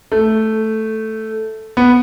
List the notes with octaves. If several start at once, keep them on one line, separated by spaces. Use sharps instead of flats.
A3
B3